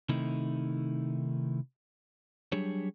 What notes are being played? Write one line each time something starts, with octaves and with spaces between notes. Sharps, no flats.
C3 D#3 A3 D#4 E4
F#3 G3 D4 G4 G#4 C#5